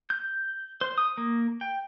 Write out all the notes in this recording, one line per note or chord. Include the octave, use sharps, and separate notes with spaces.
G6
C5
D#6
A#3
G5